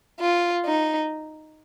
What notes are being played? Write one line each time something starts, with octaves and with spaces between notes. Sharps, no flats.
F4
D#4